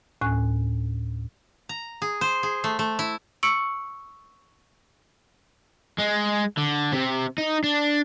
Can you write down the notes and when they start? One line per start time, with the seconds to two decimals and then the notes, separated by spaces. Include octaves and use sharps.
0.21 D2 A2 C#4 G#5 F#6
1.69 A#5
2.02 G#4
2.21 C5
2.43 G#4
2.64 A3
2.79 A3
2.99 E4
3.43 C#6 E6 C#7 D7 F#7
5.99 G#3
6.58 D3
6.93 C3
7.38 D#4
7.64 D4